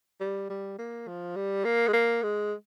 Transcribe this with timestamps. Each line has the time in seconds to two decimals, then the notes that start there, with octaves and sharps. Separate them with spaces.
0.21 G3
0.50 G3
0.78 A#3
1.08 F3
1.36 G3
1.64 A#3
1.88 G#3
1.93 A#3
2.23 G#3